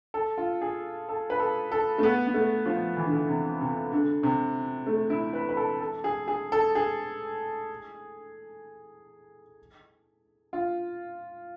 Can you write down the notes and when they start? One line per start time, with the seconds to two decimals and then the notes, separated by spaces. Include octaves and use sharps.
0.14 A4
0.38 F4
0.62 G#4
1.09 A4
1.30 B4
1.40 A4
1.72 A4
1.98 A3
2.03 B3
2.27 B3
2.34 A3
2.66 F3
2.97 E3
3.05 D3
3.13 E3
3.29 C3
3.61 C3
3.92 D3
4.23 C3
4.87 A3
5.10 E4
5.33 B4
5.49 B4
5.57 A4
5.81 A4
6.04 G#4
6.28 G#4
6.52 A4
6.75 G#4
10.53 F4